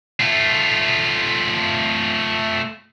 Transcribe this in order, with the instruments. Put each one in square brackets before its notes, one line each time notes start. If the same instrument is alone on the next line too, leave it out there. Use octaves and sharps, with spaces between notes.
[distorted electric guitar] A3 F4